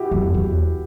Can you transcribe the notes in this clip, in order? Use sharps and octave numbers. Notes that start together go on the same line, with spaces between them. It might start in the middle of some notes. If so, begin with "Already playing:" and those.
Already playing: E4 F#4 G4
F2
E2